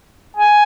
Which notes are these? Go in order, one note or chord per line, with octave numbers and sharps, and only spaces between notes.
G#5